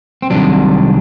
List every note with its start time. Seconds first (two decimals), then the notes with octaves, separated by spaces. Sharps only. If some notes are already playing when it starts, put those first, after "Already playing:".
0.22 C4
0.30 C2 C3 D#3 F#3 D4